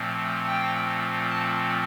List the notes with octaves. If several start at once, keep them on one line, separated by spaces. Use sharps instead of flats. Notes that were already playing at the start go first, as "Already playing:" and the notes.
Already playing: A#2 F3 A3 C4
G5
A5